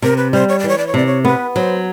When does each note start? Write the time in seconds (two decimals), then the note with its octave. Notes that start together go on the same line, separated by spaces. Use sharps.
0.02 C3 A#4
0.17 B4
0.33 G3 C5
0.49 C#5
0.59 D5
0.64 E3 C#5
0.78 D5
0.87 C#5
0.94 C3 D5
1.07 C#5
1.25 B3 B4
1.55 F#3 C5